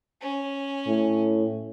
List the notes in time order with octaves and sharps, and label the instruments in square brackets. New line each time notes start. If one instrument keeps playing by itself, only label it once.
[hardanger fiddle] C#4
[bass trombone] A2